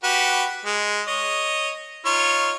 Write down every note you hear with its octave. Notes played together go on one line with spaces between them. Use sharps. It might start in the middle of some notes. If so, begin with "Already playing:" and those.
F#4 G4 B4
G#3
C#5 D#5
D#4 F4 C#5